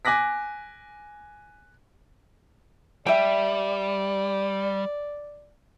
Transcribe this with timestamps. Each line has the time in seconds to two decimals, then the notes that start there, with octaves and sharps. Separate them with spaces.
0.05 G#5 D6 F#6 A#6 B6
3.07 G3 D5 E5 G5